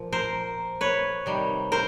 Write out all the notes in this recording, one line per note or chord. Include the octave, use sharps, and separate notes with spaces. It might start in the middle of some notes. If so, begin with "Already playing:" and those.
Already playing: A#2 F3
A#4 C5
B4 C#5
C3 D#3 G3
A#4 C5